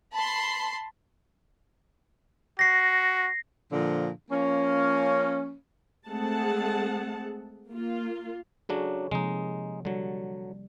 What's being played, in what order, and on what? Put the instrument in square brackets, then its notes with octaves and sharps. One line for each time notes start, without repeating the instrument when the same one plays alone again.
[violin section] A5 B5 C6
[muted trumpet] F#4 [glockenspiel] A#6 C7
[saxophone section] A#2 D3 F3
F3 A#3 C#4
[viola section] G#3 A3 C4 G#4 F#5 A5
A#3 F4
[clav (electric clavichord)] C#3 F#3 D4 [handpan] G#4 A4 C#5
[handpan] C3 F3 A#3 [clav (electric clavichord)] G#3 D#4
[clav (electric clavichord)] D3 F#3 [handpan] G3